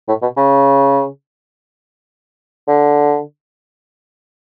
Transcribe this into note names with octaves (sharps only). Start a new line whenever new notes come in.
A2
B2
C#3
D3